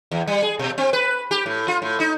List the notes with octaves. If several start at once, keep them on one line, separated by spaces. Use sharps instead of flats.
E2
G3
G#4
B2
C4
B4
G4
A2
F4
A2
D#4